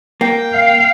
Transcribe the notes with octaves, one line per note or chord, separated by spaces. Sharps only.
A#3 G5
F5